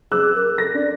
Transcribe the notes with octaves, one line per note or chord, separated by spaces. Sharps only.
G#4 D6 E6 F#6
A#4
A4 A#6
D4 D5